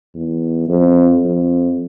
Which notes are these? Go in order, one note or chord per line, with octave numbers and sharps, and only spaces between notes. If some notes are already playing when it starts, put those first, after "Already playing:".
E2
F2
F2